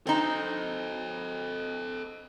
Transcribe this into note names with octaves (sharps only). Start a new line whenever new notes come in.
C4 D#4 A4 D#5